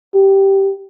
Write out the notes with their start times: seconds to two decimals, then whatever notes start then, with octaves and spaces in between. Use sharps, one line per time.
0.15 G4